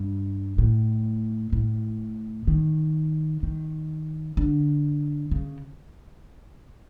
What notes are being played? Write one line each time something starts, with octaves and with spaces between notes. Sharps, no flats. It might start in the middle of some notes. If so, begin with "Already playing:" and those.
Already playing: G2
A2
A2
D#3
D#3
D3
C#3